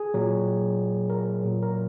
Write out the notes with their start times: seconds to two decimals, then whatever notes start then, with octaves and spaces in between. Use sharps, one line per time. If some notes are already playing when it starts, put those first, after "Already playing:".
Already playing: G#4
0.14 A#2 F#3
1.10 A#4
1.42 A#2 F#3
1.63 A#4